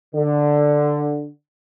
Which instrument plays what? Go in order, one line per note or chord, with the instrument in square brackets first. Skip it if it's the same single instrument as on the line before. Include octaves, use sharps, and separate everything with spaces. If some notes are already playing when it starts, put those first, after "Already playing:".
[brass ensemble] D3